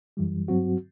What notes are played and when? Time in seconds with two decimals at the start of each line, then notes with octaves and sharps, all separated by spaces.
0.17 F#2 E3 G3
0.48 G2 F#3 C4 F#4